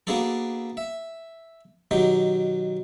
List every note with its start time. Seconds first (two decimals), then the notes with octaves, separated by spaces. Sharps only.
0.07 A#3 B3 D4 F#4 G#4 A4
0.77 E5
1.91 B2 D#3 F#3 G4